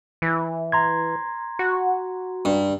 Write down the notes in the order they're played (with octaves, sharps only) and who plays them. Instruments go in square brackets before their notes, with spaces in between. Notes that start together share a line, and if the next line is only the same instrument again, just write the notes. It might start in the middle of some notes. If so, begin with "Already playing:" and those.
[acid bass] E3
[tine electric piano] A#5 C6 G#6
[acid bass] F#4
[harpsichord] G2